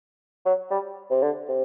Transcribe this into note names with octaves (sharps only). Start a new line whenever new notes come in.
F#3
G3
C3
D3
C3